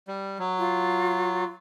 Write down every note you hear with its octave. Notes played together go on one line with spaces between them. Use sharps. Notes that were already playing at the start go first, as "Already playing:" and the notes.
G3
F#3
F4